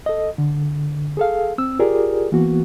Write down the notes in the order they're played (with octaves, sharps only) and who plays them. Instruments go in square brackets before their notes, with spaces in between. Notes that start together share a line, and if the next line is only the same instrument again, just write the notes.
[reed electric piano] A4 D#5
D3
G#4 A4 F5
C4 E6
F4 G4 G#4 A#4 D5
E3 A#3 B3 F#4